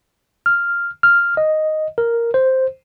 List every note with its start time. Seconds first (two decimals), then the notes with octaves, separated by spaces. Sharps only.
0.46 F6
1.03 F6
1.37 D#5
1.98 A#4
2.34 C5